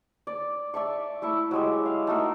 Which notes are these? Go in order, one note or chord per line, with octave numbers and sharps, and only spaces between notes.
D5
D5 E5 A5 C#6
A3 E4 E5 C#6
F#3 G#3 G4
F5
A3 D#4 F#4 A#4